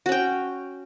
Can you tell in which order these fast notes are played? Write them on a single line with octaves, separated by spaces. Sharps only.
F#4 C#4 G5